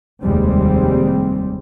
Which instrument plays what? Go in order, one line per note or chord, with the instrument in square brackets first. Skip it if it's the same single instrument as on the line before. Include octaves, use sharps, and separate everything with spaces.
[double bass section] F1 D#2 G3 G#3 C4